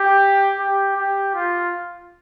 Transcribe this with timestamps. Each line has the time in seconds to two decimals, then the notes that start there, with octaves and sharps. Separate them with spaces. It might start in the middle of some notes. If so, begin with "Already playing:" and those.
Already playing: G4
0.59 G4
0.97 G4
1.35 F4